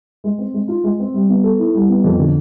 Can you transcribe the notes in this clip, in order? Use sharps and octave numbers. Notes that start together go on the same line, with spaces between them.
G#3
C4
G#3
F4
G#3
C4
G3
B3
A4
E4
G3
B3
F2
D3